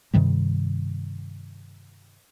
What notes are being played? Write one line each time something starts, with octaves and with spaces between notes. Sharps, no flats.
G2 C3 D#3 G3